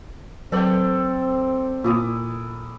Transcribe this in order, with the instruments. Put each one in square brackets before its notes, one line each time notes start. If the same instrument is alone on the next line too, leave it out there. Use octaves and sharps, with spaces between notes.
[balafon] F#3 B4 [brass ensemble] C4 [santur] A4 D5 G5
[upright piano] A#2 [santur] E4 D6 D#6